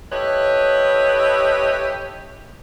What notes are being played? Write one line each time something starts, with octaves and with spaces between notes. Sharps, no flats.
E4 G4 A4 B4 C#5 D#5